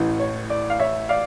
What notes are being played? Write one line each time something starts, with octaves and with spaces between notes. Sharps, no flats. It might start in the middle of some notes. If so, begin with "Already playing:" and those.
Already playing: A1 A2 E3
C#5
D5
F5
C#5 E5
D5 F5